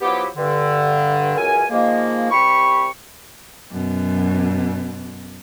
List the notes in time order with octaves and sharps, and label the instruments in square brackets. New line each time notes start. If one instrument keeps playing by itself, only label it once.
[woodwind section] F3 F#3 B3 E4 G4
G2 D3
C#2 F#2 A#4 G#5
D#3 F3 G#3 A#3
C2 G4 B5 C#6
[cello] F#2 B2